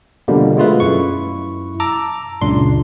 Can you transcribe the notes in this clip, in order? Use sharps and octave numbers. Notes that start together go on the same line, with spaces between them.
B2 D3 F3 G3 A#3
G#3 A3 F4 B4
F#2 E4 C#6
A5 A#5 D6 E6
C#2 F#2 A#2 D4 C6